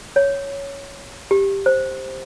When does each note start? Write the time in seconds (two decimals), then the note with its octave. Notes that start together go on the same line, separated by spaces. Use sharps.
0.16 C#5
1.31 G4
1.66 C5